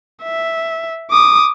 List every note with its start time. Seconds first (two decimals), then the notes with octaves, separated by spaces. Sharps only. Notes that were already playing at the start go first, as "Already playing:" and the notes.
0.24 E5
1.11 D6 D#6